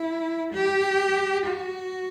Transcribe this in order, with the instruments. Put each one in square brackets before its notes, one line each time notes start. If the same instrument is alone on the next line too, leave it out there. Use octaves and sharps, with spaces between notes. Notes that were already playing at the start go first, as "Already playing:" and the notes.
Already playing: [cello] E4
G4
F#4